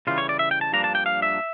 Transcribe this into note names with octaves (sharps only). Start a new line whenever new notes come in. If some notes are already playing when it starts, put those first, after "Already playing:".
C#3 E3 G3 F4
C#5
D5
E5
G5
A5
G2 F3 A#3 D4 A#5
A5
G5
F5
E5